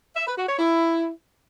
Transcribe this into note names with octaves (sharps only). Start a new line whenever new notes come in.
E5
B4
F#4
C#5
E4